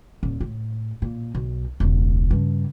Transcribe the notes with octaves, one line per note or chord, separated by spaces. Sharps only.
D#1
A2
A#2
B1
E1 C#2
G2 C#3